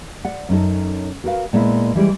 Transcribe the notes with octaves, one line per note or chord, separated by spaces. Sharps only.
D5 F#5
F#2 C#4 D#4 A4
F#4 A#4 B4 F5
A#2 G#3 B3 E4
E3 G3 G#3 D5